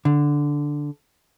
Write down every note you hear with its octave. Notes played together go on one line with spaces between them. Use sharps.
D3